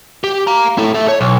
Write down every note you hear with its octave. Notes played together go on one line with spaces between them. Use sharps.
G4
F5 A#5
E4 A4
A4 E5
C#5
B1